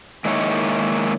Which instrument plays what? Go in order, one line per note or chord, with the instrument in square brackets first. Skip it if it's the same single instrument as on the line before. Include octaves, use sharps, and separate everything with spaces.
[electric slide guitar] D#3 G#3 A#3 D#4 E4 C#5